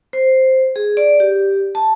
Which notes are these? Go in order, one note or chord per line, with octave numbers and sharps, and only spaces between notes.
C5
G#4
D5
G4
A5